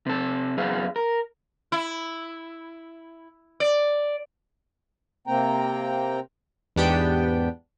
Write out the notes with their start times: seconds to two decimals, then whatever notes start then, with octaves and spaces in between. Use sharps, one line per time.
0.06 C3 A4
0.58 F#2 B3 G#4 F5
0.96 A#4
1.72 E4
3.60 D5
5.27 C3 A#3 C4 G5 A#5
6.76 E2 G#2 B3 D4 G4 G5